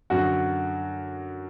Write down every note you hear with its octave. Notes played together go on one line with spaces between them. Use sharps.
F#2 D3 F#4